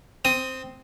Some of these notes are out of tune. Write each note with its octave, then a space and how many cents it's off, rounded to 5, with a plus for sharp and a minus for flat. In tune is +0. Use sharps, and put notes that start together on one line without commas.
C4 +0 D#6 +10